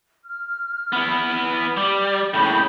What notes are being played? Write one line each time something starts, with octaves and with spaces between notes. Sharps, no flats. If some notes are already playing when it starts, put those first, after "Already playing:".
F6
B3 E4
G3
A2 C#3 G5 B5 G6